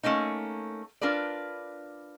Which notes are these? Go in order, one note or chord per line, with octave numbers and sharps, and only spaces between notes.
A3 A#3 C#4 D#4
D4 F4 A#4 B4 D5